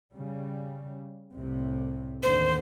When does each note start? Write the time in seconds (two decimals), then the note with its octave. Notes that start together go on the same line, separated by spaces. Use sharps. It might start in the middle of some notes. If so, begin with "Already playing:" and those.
0.14 C#3 G3
1.37 C2 A2 C3
2.23 A1 D#2 D3 C5